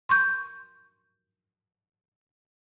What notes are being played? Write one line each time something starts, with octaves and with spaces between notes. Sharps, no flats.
C6 C#6 G6